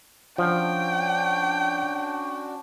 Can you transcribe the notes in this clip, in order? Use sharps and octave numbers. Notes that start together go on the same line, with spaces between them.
F3 C#4 D4 F#4 G5